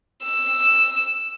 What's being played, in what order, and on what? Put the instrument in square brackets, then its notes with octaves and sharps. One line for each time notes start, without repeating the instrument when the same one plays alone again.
[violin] E6